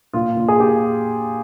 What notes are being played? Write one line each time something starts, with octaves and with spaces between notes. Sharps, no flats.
A#2 F4
A#2
G#4
A#2 G4